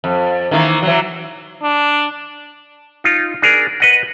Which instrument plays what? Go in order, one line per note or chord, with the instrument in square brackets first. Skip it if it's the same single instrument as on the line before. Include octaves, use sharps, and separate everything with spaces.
[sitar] F2
D#3 E3 A#3
E3 F#3
[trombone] D4
[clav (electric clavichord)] D#4 F4
D4 G#4 A#4
B4 D#5 F#5